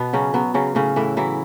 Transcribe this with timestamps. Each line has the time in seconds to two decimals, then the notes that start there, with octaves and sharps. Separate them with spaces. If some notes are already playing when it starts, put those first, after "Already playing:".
Already playing: B2 B3
0.13 C#3 F#3 C#4
0.34 F#3 B3
0.54 C#3 F#3 C#4
0.75 A2 C#3 C#4
0.96 A2 E3 E4
1.17 E3 F#3 E4